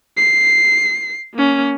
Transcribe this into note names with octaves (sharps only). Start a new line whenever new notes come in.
C7
A#3 C#4